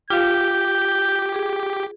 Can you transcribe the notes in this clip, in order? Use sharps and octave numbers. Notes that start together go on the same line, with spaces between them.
F4 G4 F5 G6
G#4